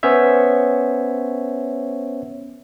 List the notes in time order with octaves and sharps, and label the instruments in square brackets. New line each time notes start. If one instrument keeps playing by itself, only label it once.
[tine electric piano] B3 C#4 C5 C#5 E5